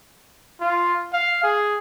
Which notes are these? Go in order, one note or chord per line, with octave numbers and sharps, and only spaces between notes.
F4
F5
G#4